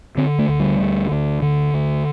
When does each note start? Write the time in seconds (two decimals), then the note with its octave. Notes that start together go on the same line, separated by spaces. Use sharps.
0.17 D3 C4
0.38 A3
0.49 D2
0.60 G3
0.80 D3
1.12 D2
1.42 D3
1.74 D2